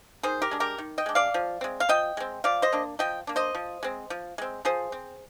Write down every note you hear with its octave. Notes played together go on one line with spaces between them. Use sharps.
D#3 G#4 C5
G4 A#4
G#3 D4
G4 A#4
D#3
D#5 G5
G#3 D4
D5 F5
F3
G#3 C4
F5
F3 D#5 G5
G#3 C4
F3 D5 F5
C5 D#5
A#3 D4
F3 D#5 G5
A#3 D4
C5 D#5
F3
G#3 C4
F3
G#3 C4
F3 G#4 C5
C4